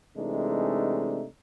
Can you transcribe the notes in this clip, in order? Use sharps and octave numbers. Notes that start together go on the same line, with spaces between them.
C3 E3 G#3 A3 D4 D#4